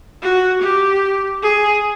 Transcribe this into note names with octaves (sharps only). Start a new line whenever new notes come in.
F#4
G4
G#4